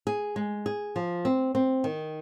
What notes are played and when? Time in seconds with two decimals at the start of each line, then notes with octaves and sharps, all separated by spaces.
0.07 G#4
0.36 G#3
0.66 G#4
0.96 F3
1.25 C4
1.55 C4
1.84 D#3